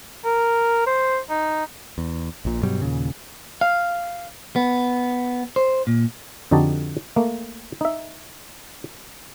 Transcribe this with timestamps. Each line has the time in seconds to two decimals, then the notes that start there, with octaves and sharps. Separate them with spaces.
0.25 A#4
0.87 C5
1.30 D#4
1.98 E2
2.45 A#1 A#2
2.63 G2 B2 F#3 G3
2.81 D#2 A#2 C#3
3.61 F5
4.56 B3
5.56 C5
5.87 A#2
6.51 F2 D3 D#4 F#4 G4 A5
7.16 A3 A#3
7.81 D#4 E5